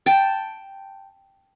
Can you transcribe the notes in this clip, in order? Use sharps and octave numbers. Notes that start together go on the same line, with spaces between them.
G5 A5